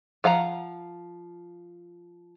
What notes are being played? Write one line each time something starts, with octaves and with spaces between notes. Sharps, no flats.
F3 F5 F#5 A#5